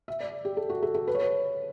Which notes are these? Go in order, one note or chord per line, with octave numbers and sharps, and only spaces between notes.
E5
D5
G4
A4
F#4
A4
A4
B4
C#5
B4